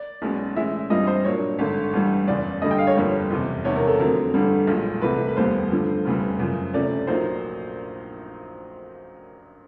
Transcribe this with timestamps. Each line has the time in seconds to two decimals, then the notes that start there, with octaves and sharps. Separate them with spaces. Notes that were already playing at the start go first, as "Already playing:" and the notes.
Already playing: D5
0.22 B1 B2 G#3 C#4
0.55 A2 E3 G#3 C#4 E4 E5
0.90 G2 E3 G3 C4 F4 D#5
1.07 C5
1.24 A#2 F#3 A#3 D4 C#5
1.59 G#1 G2 D3
1.93 A1 G2 E3 G3
2.27 F#1 E2 C#3 D5
2.62 G2 D3 G3 D#5
2.71 G5
2.78 F5
2.87 C#5
2.95 G1 F2 D3 G3 A#3
3.30 F#1 E2 C3
3.64 E1 E2 C3 D#3 C#5
3.76 A#4
3.87 A4
3.99 F2 D3 F#3 A3 C4 A#4
4.34 A1 G2 D3 G3
4.67 B1 A#2 F3 G#3
5.02 C2 C3 E3 A3 B4
5.28 B4
5.36 F1 D#2 D#3 G3 B3 C5
5.71 G2 D3 F3
6.05 F1 E2 C#3 E3 G3
6.39 F#2 C#3 F3
6.73 D2 C3 F3 A3 C#4 D5
7.07 A#1 A#2 F#3 A#3 D#4 C5